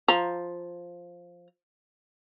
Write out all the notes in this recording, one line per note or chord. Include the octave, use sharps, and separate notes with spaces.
F3 A#5